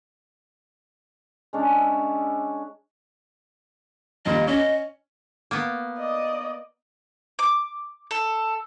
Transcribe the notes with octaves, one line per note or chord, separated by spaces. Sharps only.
G#3 C#4 D4
E5
D#2 A#2 G3 D#5
C#4 D#5
A#3 B3
D5 D#5
D6
A4